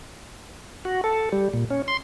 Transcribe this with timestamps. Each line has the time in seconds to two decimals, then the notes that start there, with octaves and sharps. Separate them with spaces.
0.85 F#4
1.04 A4
1.32 G3
1.54 A#2
1.70 C#4
1.88 C6